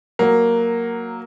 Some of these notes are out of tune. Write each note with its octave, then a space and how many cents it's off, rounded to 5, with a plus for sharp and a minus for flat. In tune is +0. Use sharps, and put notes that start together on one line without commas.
F#3 +0 A#3 +0